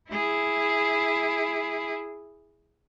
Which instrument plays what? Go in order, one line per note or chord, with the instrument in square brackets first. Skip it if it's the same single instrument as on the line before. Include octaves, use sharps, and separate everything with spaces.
[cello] E4 G#4